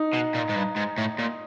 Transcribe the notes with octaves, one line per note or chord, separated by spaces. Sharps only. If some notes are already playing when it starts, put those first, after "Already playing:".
Already playing: D#4
B2
A#2
G#2
G2
G#2
A2
A#2